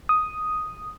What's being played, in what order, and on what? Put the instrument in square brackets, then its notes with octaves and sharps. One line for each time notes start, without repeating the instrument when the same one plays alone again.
[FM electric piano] D#6